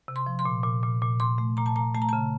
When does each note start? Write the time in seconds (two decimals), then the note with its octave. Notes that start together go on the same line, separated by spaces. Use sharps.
0.08 C3
0.16 C6
0.26 F3
0.39 C6
0.45 A#2
0.64 A#2
0.83 A#2
1.02 A#2
1.20 A#2 C6
1.38 A3
1.57 A#2 A#5
1.66 A5
1.75 A#2 A#5
1.94 A3 A5
2.02 A#5
2.09 A5
2.13 C#3